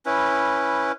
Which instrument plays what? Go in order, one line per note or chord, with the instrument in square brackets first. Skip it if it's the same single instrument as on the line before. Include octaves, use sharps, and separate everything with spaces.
[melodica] C#4 E4 B4